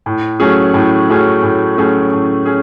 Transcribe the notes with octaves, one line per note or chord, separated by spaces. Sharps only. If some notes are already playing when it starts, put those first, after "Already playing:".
A2
F#3 A3 C#4 G#4
A2
F#3 A3 C#4 G#4
A2
F#3 A3 C#4 G#4
A2
C#4 G#4